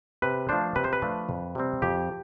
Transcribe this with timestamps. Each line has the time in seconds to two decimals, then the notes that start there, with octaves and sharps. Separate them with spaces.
0.22 C3 B4
0.49 F3 A3 D4 C5
0.75 C3 B4
0.84 C5
0.93 B4
1.02 F3 A3 D4
1.29 F2
1.55 C3 G3 C4
1.82 F2 G4